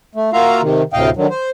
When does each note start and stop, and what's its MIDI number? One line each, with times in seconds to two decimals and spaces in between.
0.15 0.30 57
0.33 0.61 58
0.33 0.61 65
0.33 0.61 66
0.33 0.61 76
0.33 0.61 77
0.33 0.61 82
0.62 0.82 48
0.62 0.82 51
0.93 1.10 38
0.93 1.10 45
0.93 1.10 48
0.93 1.10 75
0.93 1.10 77
0.93 1.10 79
1.17 1.27 50
1.17 1.27 51
1.17 1.27 54
1.31 1.50 72